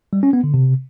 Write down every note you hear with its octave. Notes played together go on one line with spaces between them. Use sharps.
G3
C#4
B3
D3
C3